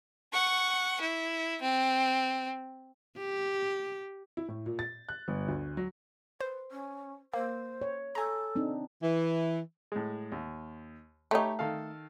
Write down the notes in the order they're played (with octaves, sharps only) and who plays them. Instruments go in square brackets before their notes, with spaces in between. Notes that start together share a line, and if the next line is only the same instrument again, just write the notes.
[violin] F#5 C#6
E4
C4
[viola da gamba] G4
[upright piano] E4
A2
A#2
A6
F#6
G1
D2
F#3
[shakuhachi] B4 [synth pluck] C5
[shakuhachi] C#4
[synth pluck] A#3 [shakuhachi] C5
[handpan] C#5
[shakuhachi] A4 [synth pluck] G#5 A#5
[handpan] C4 D4 D#4
[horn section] E3
[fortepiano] A2 G#3
D#2
[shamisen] A3 D#4 [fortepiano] G4 C#5 B5
[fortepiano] D#3 A4 F5